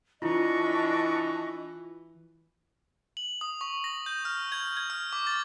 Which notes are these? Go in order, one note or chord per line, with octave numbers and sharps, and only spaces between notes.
E3 D4 E4 F4 D#5 C#6
F#7
D#6
C#6
A#6
G6
F6
G#6
G#6
F6
D6
A6